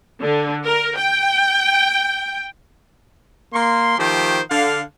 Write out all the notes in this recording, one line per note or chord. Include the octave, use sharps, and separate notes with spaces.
D3
A#4
G5
A#3 C6
D#3 F3 A3 G4 C5
D3 F5